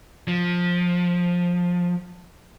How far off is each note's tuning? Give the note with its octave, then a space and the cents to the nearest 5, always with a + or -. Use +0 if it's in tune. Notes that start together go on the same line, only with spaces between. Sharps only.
F3 +15